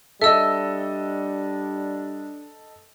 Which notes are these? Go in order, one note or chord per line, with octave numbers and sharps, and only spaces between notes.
G3 D4 A4 D#5 E5 E6